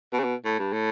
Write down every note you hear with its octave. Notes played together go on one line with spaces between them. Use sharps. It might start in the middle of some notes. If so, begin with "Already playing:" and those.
B2
C#3
B2
A2
G2
A2